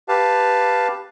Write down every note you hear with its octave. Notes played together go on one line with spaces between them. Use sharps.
G4 B4 F5 A5